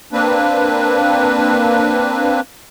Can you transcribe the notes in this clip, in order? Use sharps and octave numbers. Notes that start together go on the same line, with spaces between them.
A#3 C4 D4 B4